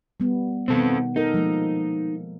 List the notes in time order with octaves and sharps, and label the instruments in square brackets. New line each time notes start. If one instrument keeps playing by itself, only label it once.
[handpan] G3 B3
[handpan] B2 D#3 B3 [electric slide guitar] C4 A4
[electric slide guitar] D#4 [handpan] A4 A#4
[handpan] F3 G#3 A#3